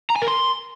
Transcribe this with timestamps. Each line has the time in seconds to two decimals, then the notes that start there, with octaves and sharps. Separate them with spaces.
0.10 A#5
0.16 G#5
0.22 A#4
0.28 C6